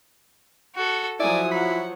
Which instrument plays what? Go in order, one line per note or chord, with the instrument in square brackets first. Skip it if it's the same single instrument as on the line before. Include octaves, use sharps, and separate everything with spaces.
[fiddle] F#4 A4
[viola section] F3 F#3 C#5 [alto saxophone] E4 [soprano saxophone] D5 [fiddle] G#5 D#6
[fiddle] F#5 [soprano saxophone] B5